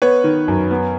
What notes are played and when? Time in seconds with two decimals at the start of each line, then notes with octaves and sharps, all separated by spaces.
0.02 B3 B4 C#5
0.24 D#3
0.48 F#2
0.71 B3